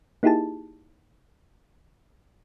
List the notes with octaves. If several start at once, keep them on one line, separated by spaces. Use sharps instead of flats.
A#3 D#4 E4 G4 G#4 A5